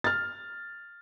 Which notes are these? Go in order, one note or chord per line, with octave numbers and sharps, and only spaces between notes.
F6 A6